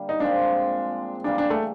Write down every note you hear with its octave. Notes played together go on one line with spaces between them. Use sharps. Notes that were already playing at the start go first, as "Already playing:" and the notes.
Already playing: D3 G3 A#3
D#4
A#2 F3 G#3 C4 D4
C#3 E3 G3 A#3 D4
D4
A3